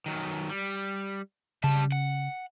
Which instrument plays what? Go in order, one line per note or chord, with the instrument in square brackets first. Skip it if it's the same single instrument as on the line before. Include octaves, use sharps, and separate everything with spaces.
[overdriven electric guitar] D#3 F#3
G3
[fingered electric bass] C#3 C#4 [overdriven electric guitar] G3 A5
[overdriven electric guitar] F#5